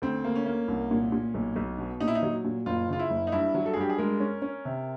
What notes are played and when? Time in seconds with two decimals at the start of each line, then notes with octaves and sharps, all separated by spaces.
0.02 D2 C4
0.24 A#3
0.35 C#4
0.46 A#3
0.68 C2
0.91 A#2
1.12 A#2
1.34 B1
1.56 B1
1.78 B2
2.00 A#2 D#4
2.08 E4
2.15 D#4
2.22 F#3
2.44 A#2
2.66 F#1 F4
2.89 C#3 F4
2.99 E4
3.10 F#1
3.27 D#4
3.32 G2 E4
3.54 F#3
3.66 A4
3.73 G#4
3.76 G2 G4
3.90 G#4
3.98 G#3 A#4
4.20 C#4
4.42 C#4
4.65 C3